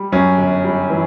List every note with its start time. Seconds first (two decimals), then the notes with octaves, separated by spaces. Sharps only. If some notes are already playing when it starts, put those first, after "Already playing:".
Already playing: G3
0.12 F#2 C#4
0.38 G1
0.65 G3
0.90 E3